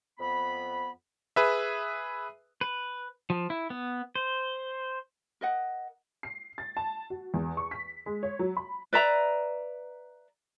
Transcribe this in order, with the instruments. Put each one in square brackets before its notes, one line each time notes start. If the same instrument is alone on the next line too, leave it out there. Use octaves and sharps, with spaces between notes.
[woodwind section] F2 B3 B5
[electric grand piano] G#4 B4 E5
[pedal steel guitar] B4
F3
E4
B3
C5
[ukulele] A#4 D#5 F#5
[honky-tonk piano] C7
A6
A5
F#4
E2
C#6
B6
G#3
C#5
F#3
B5
[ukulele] B4 D5 E5 A#5